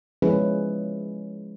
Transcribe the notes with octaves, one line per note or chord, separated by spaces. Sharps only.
F3 G#3 C#4 E4 G#4 B4